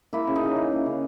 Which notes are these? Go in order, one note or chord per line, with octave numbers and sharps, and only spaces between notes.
A#3 E4 E5
C#3
D#4 D#5
C#3
E3
A#3
C#3